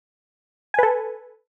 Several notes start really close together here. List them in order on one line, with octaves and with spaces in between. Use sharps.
G#5 B4 A4